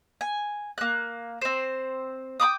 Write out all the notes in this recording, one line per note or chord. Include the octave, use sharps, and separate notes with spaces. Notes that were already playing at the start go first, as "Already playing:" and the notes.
G#5
A#3 F#6
C4 C5
G5 B5 D6 D#6